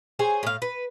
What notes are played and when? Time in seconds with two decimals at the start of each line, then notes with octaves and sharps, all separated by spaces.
0.19 G#4 C5 C#5 G#5
0.43 A2 F5
0.62 B4